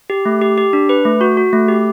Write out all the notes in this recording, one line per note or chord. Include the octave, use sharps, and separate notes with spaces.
G4
A3
G4
G4
D4
B4
A3
F#4
F#4
A3
G4